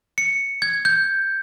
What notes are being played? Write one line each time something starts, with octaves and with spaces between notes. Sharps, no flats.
C#7
G#6
G6